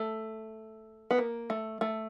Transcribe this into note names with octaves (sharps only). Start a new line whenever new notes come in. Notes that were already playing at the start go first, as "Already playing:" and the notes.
Already playing: A3
B3
A#3
A3
A3